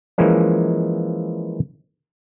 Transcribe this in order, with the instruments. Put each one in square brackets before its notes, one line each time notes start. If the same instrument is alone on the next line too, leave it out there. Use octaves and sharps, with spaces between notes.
[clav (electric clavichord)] E3 F3 G#3 A#3 C#4